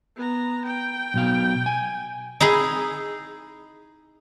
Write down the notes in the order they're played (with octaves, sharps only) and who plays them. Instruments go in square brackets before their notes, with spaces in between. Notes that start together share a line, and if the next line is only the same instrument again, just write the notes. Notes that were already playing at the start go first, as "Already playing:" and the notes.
[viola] B3 A#5
G5
[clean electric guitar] B1 B2 F5
G#5
[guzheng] D#4 E4 G#4